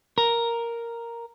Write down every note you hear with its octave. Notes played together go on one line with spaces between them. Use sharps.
A#4